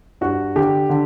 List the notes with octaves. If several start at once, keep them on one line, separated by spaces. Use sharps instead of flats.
G2 F#4
D3 G4
D3